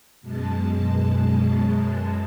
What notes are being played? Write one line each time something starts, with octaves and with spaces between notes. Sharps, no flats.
F#2 B2 G#3 A5